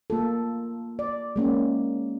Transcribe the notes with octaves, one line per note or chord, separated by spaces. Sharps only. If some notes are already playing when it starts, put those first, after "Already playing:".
A#3 F4 A4
D5
G#3 A#3 C#4